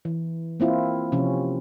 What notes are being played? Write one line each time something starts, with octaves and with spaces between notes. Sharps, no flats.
E3
A#3 C4 E4 F4
C3 F3 C#4